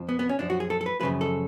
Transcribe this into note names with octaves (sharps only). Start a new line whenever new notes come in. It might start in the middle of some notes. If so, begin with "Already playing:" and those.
Already playing: F2 F3
B3
B3
C#4
F#2 F3 D4
F#4
G#4
A4
A4
B4
F#2 C#3 F3 B4
A4